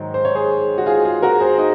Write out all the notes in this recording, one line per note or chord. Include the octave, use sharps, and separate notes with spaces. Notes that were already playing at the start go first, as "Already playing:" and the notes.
Already playing: G#2 D#3 F#3 C5
C5
C#5
G#4 C5
F#4
F4 G#4
F4 G#4
F#4 A#4
G#4 C5
D#4